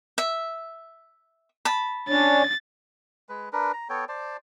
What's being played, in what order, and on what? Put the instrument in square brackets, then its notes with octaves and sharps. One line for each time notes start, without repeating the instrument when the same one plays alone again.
[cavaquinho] E5
A5 B5
[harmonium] C#4 D4 C#5 [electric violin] A6
[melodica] G#3 B4
D4 A#4 B4
A#5
B3 A4 C#5 G5
C5 D5 A5